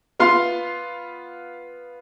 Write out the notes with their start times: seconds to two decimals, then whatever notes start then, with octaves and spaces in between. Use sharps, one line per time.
0.20 B3 F4 F5 C6